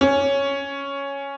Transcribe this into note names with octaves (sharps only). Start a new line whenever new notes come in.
C#4